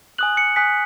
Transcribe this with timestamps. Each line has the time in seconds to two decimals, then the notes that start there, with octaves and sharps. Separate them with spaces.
0.18 G#5 D#6 F#6 F#7
0.37 C#7
0.56 G#5 D#6 F#6 B6